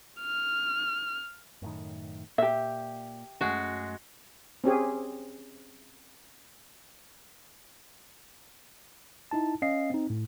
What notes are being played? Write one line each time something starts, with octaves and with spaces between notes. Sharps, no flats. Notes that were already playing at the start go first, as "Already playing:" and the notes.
F6
F#2 A2 D#3
A#2 G4 E5
F#2 G#3 A3 C#4 F#4
C4 C#4 G4 G#4
D#4 E4 A5
C#4 D#5 F5 C7
C4 D#4
A2